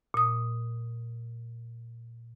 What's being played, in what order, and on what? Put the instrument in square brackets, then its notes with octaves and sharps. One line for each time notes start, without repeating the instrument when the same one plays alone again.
[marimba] A#2 D#6